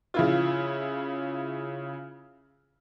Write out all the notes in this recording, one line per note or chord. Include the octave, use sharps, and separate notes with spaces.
C#3 E4 F4